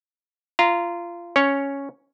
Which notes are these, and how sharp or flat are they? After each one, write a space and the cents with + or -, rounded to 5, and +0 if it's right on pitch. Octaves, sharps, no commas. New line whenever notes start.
F4 -20 A#5 +0
C#4 +0 C#5 +0